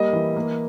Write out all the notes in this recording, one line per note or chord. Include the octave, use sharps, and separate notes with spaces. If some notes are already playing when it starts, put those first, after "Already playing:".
Already playing: G3 A#3 D#5
E3
A#3